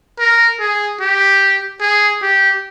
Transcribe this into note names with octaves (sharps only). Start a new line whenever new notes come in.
A#4
G#4
G4
G#4
G4